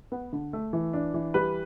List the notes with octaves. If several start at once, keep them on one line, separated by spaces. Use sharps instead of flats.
B3
D3
A3
E3
D4
E3
G3 B4